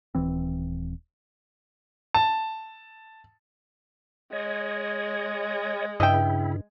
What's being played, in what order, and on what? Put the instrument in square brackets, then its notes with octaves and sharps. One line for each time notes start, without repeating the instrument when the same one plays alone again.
[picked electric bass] D#1 E3 C4
[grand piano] A5
[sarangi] G#3 [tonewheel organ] C#5 D#5
[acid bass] G2 [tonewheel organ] C#3 E4 [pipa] D#5 E5 G5